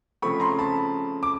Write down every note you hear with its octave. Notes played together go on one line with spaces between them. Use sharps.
C#3 F3 A3 C4 B5 C#6
A#5 C6
A5 B5
D6